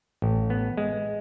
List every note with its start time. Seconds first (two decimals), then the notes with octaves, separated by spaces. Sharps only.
0.22 A1
0.50 B3
0.78 G#3